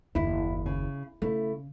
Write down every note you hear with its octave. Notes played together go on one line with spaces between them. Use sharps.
F#1 D#2 E4
C#3
C#3 A3 E4